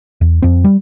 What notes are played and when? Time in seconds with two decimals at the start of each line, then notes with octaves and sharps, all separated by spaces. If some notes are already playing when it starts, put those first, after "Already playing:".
0.21 E2
0.42 F2 C4
0.64 G3